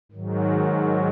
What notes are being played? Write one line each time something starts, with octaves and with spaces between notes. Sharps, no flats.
G#2 D#3 F#3